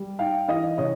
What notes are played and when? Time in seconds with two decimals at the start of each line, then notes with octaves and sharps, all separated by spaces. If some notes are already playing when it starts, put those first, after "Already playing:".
Already playing: G3
0.19 D#4 F5 G5
0.48 E3 D#5 F5
0.77 C#3 C#5 D#5